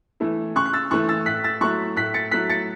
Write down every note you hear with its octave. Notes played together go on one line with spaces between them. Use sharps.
E3 A3 E4
C#3 C#6 F#6
F#6
E6 A6
E3 A3 E4 C#6 F#6
E6 A6
A2 F#6 B6
E6 A6
F#3 A3 E4 C#6 F#6
A2 F#6 B6
A6 C#7
F#3 A3 E4 F#6 B6
A6 C#7